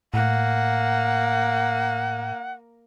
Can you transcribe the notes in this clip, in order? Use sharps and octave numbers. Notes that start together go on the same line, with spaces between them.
A2 A#3 F#5